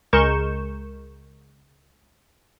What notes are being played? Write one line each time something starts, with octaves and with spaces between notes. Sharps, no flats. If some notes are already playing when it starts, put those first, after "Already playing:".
C#2 G#3 A#4 C#6 G6 E7